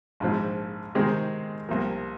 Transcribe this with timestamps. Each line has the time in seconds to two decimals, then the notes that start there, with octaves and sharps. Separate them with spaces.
0.20 A#1 G#2 F3 C4
0.95 C3 D#3 G#3 C4
1.68 C2 C3 F3 A#3